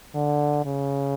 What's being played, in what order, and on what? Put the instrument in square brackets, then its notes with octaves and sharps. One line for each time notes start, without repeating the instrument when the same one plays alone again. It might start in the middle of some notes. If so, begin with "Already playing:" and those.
[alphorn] D3
C#3